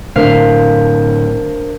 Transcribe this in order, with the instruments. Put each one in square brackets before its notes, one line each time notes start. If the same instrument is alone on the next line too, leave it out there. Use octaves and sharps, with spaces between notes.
[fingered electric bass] A2 D3 [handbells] D4 A#4 C5 [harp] F5